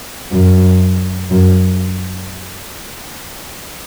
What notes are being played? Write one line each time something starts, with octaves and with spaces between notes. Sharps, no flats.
F#2
F#2